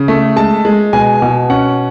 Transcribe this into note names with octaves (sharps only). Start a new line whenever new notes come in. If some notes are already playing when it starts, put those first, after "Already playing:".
Already playing: C#3
A3
G#3 A5
G#3
B2 G#5
B2
C#4 F#5